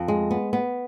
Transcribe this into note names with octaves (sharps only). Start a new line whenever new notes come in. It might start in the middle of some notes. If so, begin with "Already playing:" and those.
Already playing: F2
G#3
B3
B3